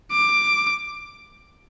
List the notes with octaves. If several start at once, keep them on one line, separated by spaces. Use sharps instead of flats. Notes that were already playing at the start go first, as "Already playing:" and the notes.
D6